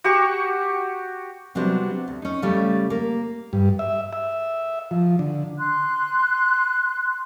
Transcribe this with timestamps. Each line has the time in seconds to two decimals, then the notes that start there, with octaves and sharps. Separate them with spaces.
0.04 F#4 G4 C#6
1.55 C3 F#3 G3 B3 D4 C5
2.08 D2
2.22 C#4 D#4
2.42 C#3 G3 A3
2.90 A#3
3.53 G2
3.79 E5
4.13 E5
4.91 F3
5.19 D3
5.57 C6 F#6